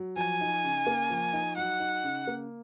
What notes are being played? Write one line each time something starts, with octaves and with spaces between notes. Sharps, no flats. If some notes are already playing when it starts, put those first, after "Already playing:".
Already playing: F#3
F3 G#5
D#4
C#3
A#3
F3
D#4
F#3 F#5
D#4
C#3
A#3